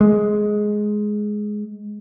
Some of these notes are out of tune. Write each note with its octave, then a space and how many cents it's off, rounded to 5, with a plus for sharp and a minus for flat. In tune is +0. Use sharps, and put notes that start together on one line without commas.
G#3 +10